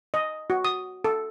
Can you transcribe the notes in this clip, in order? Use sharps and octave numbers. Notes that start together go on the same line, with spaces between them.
D#5
F#4
D#6
A4